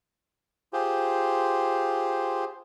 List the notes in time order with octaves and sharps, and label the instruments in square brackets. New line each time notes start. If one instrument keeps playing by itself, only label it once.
[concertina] F4 G4 G#4 C5